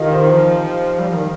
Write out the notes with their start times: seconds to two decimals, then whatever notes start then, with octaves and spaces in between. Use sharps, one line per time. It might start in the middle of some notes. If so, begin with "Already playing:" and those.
Already playing: D#3 D#4 F4 G4 A#4 D#5 F5
0.11 C5
0.33 F3
1.00 G3
1.08 F3
1.16 D#3